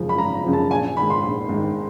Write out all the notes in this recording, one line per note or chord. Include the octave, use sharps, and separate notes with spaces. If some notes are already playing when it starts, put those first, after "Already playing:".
Already playing: G#1 F#2 C#3 F3
B5
G#1 A#5
A#5
F#2 C#3 F3
A5
A#1 G#5
G#2 D#3 B5
C6
A#1
G#2 D#3